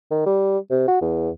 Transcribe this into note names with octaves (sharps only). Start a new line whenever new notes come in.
D#3
G3
C3
F#4
E2